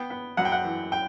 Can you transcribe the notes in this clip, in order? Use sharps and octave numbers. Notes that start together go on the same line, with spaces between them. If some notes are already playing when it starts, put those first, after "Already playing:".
Already playing: B3 G5
B3
F#2 F#5
G5
F#5
E3
G5